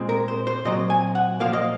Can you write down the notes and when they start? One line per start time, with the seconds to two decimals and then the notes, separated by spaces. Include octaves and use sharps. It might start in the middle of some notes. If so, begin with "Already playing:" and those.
Already playing: A#2 G#3 C4
0.09 A#4
0.28 C5
0.47 C5
0.65 A#2 F#3 C4 D#5
0.90 G#5
1.15 F#5
1.40 A#2 F3 A#3 F5
1.53 D#5